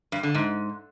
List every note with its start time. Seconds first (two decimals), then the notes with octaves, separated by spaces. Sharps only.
0.12 G2
0.23 D3
0.35 G#2